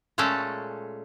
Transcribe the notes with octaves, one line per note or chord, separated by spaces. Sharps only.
A#2 G#3 A3 C#4 A4